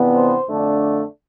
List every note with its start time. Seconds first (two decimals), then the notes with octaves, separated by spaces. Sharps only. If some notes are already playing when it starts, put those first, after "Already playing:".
Already playing: F2 C3 E3 B3 D4
0.14 C5
0.49 F2 D3 A3 D4